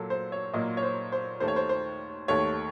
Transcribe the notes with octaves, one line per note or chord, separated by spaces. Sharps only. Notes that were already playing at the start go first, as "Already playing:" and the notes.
Already playing: A#2 F#3 A#3 A4
C5
C#5
A#2 F#3 A#3 D#5
C#5
C5
C5
D#2 D#3 A3 C5
C#5
C5
C5
D#2 D#3 A3 C#5